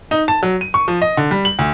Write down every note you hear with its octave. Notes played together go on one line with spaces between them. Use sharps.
D#4
A5
F#3
D#7
C#6
F3
D#5
D3
G3
F#7
D2